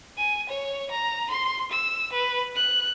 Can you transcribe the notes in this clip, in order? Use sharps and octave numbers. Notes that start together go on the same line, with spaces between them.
G#5
C#5
A#5
C6
E6
B4
F#6